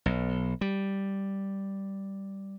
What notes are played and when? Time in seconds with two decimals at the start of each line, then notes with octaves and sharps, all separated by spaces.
0.06 B1
0.61 G3